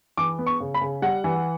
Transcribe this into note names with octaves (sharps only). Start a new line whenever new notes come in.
E3 D6
B3
C#6
C#3
B5
C#3
G3 F#5
E3